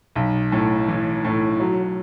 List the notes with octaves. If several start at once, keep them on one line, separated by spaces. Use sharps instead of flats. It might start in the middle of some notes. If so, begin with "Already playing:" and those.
B1
A2
E3
A2
F#3